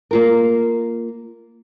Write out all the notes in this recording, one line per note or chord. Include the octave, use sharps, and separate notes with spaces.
A#3 F4 A#4